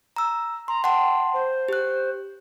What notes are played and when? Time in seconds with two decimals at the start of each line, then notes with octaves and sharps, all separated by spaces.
0.16 A#5 E6
0.68 A#5 C6
0.84 F#5 G5 A5 C6
1.34 C5
1.69 G4 F#6